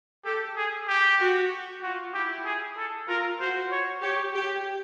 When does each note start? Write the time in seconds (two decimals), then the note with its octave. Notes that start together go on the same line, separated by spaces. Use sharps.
0.25 G4 A4
0.56 G#4
0.88 G4
1.19 F#4
1.82 F4 F#4
2.13 E4 G4
2.45 G#4
2.77 A4
3.08 F4 A#4
3.40 F#4 C5
3.71 C#5
4.02 G4 C#5
4.35 G4